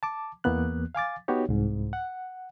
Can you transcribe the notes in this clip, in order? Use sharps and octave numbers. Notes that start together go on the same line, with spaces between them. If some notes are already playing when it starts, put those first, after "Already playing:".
A5 D6
E2 E3 A#3 B3 F#6
F5 G#5 D6 A6
B3 D#4 F#4 G4 C#5
C2 G#2
F#5